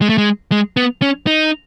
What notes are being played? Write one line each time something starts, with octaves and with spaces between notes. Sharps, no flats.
G#3
A3
G#3
G#3
B3
C#4
D#4